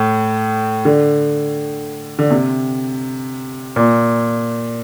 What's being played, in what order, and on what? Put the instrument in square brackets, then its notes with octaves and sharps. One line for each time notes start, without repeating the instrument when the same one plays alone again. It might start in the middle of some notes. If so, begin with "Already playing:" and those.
Already playing: [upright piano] A2
D3
D3
C3
A#2